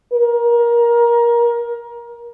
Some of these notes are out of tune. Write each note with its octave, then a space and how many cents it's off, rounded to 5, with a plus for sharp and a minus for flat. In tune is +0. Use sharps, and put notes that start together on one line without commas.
A#4 +20